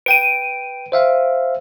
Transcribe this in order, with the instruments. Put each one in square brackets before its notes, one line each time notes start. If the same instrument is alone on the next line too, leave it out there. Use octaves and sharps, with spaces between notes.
[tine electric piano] B4 G5 [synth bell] D7 D#7
[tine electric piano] C5 E5 F5